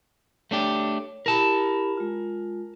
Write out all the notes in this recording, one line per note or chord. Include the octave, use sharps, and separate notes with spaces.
A3 D4 G4 C#5
E4 G4 A#4 A5 B5
G#3 F4